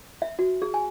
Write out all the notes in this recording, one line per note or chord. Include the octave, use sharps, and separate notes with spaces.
E5
F#4
G#4
G#5